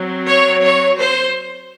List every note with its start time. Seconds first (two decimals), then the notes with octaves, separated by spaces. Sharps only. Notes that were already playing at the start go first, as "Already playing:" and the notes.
Already playing: F#3 C4
0.27 C#5
0.63 C#5
0.99 C5